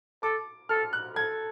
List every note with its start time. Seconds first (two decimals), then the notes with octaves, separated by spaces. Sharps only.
0.23 A4 D6
0.69 A4 F6
0.93 F#6
1.16 A4 G#6